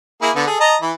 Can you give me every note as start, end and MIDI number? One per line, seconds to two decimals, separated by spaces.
0.22 0.31 58
0.22 0.31 64
0.22 0.31 68
0.36 0.45 50
0.36 0.45 59
0.47 0.58 68
0.47 0.58 69
0.60 0.76 75
0.60 0.76 81
0.60 0.76 82
0.82 0.92 52
0.82 0.92 64